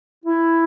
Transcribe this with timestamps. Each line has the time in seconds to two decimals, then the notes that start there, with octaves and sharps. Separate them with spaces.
0.24 E4